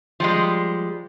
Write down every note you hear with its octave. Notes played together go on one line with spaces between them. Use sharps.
F3 G3 G#3